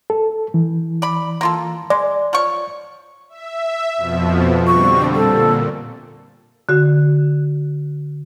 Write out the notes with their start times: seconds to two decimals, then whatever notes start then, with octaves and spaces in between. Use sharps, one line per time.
0.10 A4
0.54 E3
1.02 D5 B5
1.41 A#3 F4 A4
1.90 G#3 D5
2.33 F3 C#5 C#6
3.29 E5
3.97 F2 B2 F3
4.67 D3 G3 C4 C#6
5.15 A#2 A4
6.69 D3 F#4